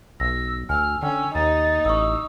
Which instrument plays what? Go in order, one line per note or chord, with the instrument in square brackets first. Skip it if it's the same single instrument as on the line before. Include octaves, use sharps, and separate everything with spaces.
[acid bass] B1 [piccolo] E6 [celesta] A#6
[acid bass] D2 [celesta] G#5 E6 [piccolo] F6
[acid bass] D3 [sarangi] C#4 [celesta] G5 [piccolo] E6
[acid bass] D#2 [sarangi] D#4 [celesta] A#5 [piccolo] A6
[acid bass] A1 [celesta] C#6 D#6 [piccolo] E6